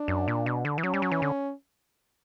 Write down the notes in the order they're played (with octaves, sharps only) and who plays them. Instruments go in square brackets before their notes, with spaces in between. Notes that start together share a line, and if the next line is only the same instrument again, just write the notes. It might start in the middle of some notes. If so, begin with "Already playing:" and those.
Already playing: [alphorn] D4
[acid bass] F#2
A#2
B2
D3
E3
[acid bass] F#3 [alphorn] C#4
[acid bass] G3
F#3
E3
D3